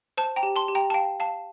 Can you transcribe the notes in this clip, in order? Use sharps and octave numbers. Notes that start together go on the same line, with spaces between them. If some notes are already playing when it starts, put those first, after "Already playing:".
C5 A5
G5 A#5
G4
A5 C6
G4
G5 A#5
A5
F5 G5
F5 A5